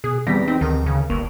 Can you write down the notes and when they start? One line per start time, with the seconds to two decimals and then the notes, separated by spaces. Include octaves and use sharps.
0.04 B2 G#4
0.27 E2 C3 G3 A#6 B6
0.48 C4 D#4
0.61 D2 D#3 A#4
0.86 C#3
1.10 G1 A#3 C#6